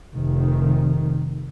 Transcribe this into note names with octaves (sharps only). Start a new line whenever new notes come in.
F1 D#3